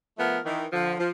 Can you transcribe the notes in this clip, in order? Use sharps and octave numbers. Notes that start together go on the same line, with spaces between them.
F3 A3 B3 A#4
D#3 E3
D3 F3
F3